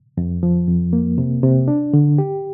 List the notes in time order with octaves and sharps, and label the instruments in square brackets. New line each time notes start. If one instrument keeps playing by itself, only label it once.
[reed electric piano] F2
F3
F2
A#3
C3
C3
D4
D3
G4